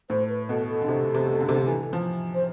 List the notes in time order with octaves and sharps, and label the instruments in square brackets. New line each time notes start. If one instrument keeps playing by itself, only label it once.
[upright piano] A2 [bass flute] C5
[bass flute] B4
[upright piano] B2 [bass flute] A4
[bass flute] A4
[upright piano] D3
C3
C3
D3
C3
D3
E3
F3
[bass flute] C5